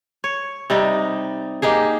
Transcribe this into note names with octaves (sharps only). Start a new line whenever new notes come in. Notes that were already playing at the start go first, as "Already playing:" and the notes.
C#5
C3 G3 D#4
A#3 D#4 G4 G#4